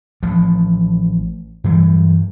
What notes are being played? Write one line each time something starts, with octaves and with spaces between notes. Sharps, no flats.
A1 F3
G2 E3 F#3 G3